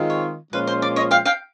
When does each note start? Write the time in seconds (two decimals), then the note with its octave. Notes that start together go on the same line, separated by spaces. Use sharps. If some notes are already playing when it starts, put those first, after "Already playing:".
Already playing: D#3 G#3 C4 F4
0.10 C#5
0.53 A#2 F3 G#3 C#4 F4 B4
0.67 C5
0.82 D5
0.96 C#5 D#5
1.11 F5 G5
1.25 F5 G5